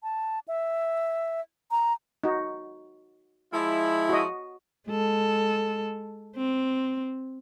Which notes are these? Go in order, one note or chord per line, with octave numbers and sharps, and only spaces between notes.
A5
E5
A#5
D#4 F#4
F3 G#3 E4
F#4 D#5
G#3 A4
C4